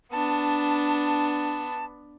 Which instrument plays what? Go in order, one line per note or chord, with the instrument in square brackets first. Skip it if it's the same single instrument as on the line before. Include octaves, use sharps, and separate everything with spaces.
[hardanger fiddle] B3 D4 [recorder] A5